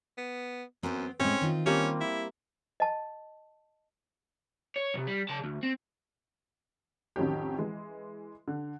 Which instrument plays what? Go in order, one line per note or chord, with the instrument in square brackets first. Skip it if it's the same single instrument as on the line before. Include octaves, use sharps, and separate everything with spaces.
[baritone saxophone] B3
[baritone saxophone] F#2 [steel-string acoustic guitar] B3 C4
[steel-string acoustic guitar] A2 G#3 [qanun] C4 [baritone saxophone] C#4
[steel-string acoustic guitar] D#3 F4
[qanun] G3 A#3 C4 [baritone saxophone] C#4
[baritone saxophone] E4
[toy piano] D#5 A5
[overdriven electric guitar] C#5
B1 C3
G3
C#3 A5
D2
C4
[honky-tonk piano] A1 F2 D#3 F#3 C#4 G4
E3 G#3
D3